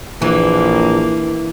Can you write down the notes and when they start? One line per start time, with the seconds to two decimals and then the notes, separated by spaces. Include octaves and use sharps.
0.22 A#1 E3 A#3